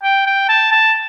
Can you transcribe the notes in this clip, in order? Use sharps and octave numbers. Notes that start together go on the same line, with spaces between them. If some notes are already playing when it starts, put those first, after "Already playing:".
G5
G5
A5
A5